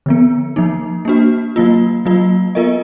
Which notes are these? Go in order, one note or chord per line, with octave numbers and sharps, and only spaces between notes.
D3 F3 B3
F3 A#3 D#4
A#3 D4 F#4
F#3 A#3 F4
F#3 A#3 F4
B3 F4 A#4 D#5